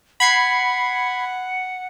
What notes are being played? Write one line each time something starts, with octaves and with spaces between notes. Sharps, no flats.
F#5 B5 G#6 C7